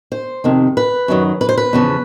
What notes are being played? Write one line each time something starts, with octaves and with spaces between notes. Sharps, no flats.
C5
F2 C3 D#3
B4
F#2 D#3 F#3
B4
C5
B4
E2 C#3 F3